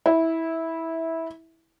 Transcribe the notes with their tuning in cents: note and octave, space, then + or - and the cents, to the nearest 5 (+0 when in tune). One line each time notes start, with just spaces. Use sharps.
E4 -15